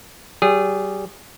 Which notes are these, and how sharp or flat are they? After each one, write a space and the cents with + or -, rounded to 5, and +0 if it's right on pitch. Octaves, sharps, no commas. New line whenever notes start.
G3 -35 G#4 -20